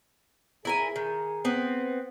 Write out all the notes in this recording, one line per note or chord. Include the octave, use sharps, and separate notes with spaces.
E4 G#4 A#4 G#5
D#3
B3 C4